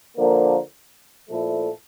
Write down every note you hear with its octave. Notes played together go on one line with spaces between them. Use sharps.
D3 F3 A#3
A#2 F3 A3 E4 A4